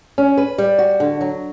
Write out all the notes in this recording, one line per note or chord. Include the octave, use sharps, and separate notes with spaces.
C#4
B4
G3
F#4
D3
F#3